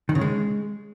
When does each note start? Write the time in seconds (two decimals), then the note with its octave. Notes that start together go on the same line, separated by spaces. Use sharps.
0.09 D#3
0.15 C#3
0.21 G#3